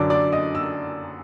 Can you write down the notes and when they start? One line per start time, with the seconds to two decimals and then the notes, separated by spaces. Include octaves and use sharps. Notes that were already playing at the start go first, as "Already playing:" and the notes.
Already playing: F#2 D3 F#3 D5 D6
0.10 D5 D6
0.32 D#5 D#6
0.55 E6